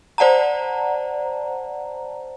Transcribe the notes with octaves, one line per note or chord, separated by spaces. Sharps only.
C5 D5 F#5 A5 A#5